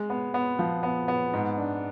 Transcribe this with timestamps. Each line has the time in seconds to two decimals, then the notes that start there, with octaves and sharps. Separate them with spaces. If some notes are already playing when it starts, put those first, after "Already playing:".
Already playing: G#3
0.10 B3
0.34 B3
0.59 F3
0.83 B3
1.08 B3
1.34 G#2
1.58 D4